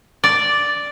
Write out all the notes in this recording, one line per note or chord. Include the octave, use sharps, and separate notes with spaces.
D5